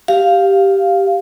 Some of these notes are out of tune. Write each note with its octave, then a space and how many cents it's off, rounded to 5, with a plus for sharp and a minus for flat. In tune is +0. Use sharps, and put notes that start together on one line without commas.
G4 -5 F5 +0